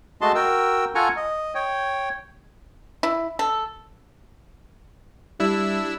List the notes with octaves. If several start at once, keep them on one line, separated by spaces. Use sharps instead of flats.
G#3 A3 F#4 D#5 A5 C6
F#4 A#4 G5 E6
F4 A4 F#5 G#5 A#5 C#6
D#5
C#5 G5
E4
A4
G3 D4 E4 E6